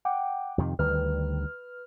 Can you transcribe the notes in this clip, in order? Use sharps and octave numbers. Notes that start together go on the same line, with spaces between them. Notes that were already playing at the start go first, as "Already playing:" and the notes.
F#5 G5 D6
F2 C3 D#3
D2 D#3 G3 B4 F6